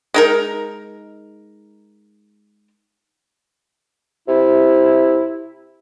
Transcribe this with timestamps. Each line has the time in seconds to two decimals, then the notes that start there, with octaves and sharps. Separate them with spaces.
0.14 G#3 D#4 A#4
4.28 C3 E4